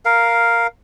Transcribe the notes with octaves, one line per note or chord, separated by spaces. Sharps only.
A#4 F5